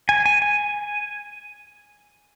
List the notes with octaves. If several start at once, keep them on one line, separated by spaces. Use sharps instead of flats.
G#5
G#5
G#5